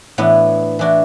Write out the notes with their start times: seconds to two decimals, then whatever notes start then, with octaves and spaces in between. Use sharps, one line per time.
0.18 A2 E3 B3 D4
0.79 E3 D4 F#4